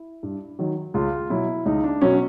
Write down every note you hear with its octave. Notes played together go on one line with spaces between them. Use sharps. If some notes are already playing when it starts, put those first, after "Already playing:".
Already playing: E4
G2
D#3 F#3
C#2 F4
B2 F#3 E4
C#2 D#4
D4
B2 F#3 C#4